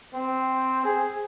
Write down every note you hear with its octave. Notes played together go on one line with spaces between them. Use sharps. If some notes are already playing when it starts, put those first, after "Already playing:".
C4
G#4